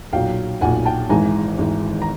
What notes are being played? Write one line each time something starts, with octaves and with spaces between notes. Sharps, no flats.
B1 A#2 F#3 F5 G5
B1 A#2 F#3 F#5 G#5
G5 A5
G#1 G#2 E3 G#5 A#5
G#1 G#2 E3
A#5